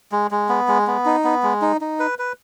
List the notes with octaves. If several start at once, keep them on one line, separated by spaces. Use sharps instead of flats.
G#3
G#3
B3
G#3
B3
D#4
B3
G#3
D#4
D#4
B4
B4